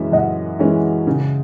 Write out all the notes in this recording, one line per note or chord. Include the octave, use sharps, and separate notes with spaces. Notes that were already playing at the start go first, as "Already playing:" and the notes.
Already playing: F#2 E3 G#3 C#4 E5
F#2 D#5 F#5
E3 G#3 C#4
C#3